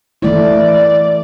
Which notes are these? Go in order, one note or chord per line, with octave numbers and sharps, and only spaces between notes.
E3 A3 E4 D5